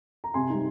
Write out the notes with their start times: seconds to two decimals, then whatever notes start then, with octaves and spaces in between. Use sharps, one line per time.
0.24 A#5
0.34 C3 G#5 C6
0.50 G3 C4 D#4